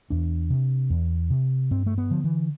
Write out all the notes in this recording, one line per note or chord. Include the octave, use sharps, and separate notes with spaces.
E2 D4
C3
E2
C3
G2 C4
A3
B3
D3 F3
E3